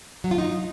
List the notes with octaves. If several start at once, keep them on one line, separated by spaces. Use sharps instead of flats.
F#3
F4
D#4